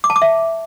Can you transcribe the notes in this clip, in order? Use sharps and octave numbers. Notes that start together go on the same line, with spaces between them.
D6
A5
D6
E5